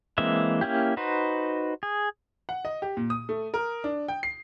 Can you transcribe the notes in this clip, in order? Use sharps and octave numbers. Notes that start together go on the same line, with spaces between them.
E3 G#3 A#3 C4 E5
A#3 C#4 E4 G4
D#4 F#4 B4 C5
G#4
F#5
D#5
G4
A#2
D#6
A3
A#4
D4
G5
C7